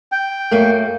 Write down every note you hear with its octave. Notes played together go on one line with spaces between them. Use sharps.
G5
F#2 A3 A#3